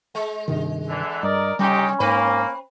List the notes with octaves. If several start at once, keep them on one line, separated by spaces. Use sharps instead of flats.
G#3
G2 C3 D#3
D3 E3
G2 A#4 D5 D#5
C3 G3 C#4 D#4 G4
G#2 A#3 C4 B4